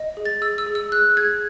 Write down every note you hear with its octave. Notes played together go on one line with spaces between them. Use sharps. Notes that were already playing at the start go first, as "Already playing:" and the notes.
Already playing: D#5
G#4
A6
G#4 E6
E6
G#4
E6
G#4 F#6
G#4 G#6